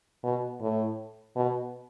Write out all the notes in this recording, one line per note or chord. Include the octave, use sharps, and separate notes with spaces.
B2
A2
B2